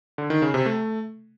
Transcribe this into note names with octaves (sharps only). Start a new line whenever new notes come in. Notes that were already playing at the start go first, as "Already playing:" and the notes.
D3
D#3
C#3
C3
A3